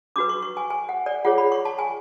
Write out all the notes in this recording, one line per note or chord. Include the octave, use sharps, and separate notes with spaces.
D4 F#4 B4 D6
C#6
C#6
G#5
G#5
F#5
D5
F4 G#4 C#5 F#5
B5
C#6
A5
G#5